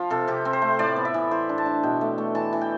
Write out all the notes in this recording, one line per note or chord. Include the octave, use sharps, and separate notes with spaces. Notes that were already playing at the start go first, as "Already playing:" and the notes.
Already playing: F3 F4
C3 A4
C3 G4
C4
C5
A3
A2 D5
B3
E5
E3
E3 C5
D4
A5
D4
B2 G5
A3
A3
E3 A5
E3
G5